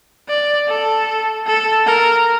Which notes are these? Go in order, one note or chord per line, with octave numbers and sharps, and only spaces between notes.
D5
A4
A4
A#4